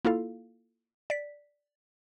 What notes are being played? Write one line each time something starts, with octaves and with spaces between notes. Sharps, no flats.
A#3 E4 F4 A4 F5
D5 B6